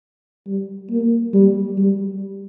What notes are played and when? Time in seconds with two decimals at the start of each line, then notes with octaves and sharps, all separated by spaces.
0.47 G3
0.90 A#3
1.33 G3
1.77 G3